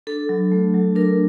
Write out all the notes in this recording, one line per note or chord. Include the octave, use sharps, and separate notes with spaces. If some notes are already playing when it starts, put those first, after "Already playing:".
D4 A4
F#3
A3
F#3
D4 A#4